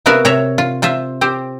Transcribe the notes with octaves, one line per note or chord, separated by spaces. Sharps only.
C3 B3 F#4 A#4 E5 F5
C3 C#5 E5 A#5
F4
C3 F4 C5 E5
C4 G4 C5